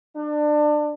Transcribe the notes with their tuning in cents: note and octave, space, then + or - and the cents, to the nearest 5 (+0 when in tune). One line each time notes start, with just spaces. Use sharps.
D4 +25